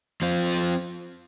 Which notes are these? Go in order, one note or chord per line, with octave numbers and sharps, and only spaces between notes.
F3 C4 F4